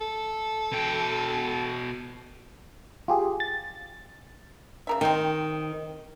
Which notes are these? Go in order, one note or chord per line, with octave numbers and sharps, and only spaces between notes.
A4
B2 G5
F4 G4 G#4
A6
C#3 A#4 E5
D#3 C4 G5